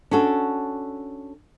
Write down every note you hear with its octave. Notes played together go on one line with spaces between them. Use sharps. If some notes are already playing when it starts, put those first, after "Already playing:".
C#4 D4 F#4 A4